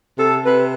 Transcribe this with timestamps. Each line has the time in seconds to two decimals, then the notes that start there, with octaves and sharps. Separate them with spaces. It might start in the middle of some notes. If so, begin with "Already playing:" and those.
0.17 C3 A4
0.43 C3 B4